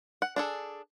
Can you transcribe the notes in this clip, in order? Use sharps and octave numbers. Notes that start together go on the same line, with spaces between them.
F#5
D4 G#4 A4